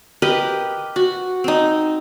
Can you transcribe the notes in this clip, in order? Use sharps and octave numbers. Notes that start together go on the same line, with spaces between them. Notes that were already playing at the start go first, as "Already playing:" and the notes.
G4 A#4 B4 D#5
F#4
C4 D#4